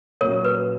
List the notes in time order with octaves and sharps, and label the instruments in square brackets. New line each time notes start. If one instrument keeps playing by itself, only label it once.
[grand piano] A#2 F#3 A#3 C#4 F#4 [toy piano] A#4 C#5
[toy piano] B4